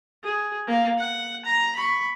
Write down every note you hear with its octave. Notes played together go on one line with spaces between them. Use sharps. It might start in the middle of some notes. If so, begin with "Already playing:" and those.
G#4
A#3 F5
F#5
A#5
B5 C#6